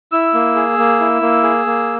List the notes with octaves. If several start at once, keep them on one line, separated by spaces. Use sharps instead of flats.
E4 E6
A#3
G#4
A#3
E4
A#3
G#4
A#3